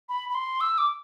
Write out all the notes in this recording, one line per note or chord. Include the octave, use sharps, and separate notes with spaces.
B5
B5
C6
E6
D6